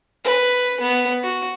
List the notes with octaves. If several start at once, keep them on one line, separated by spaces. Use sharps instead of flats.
B4
B3
F#4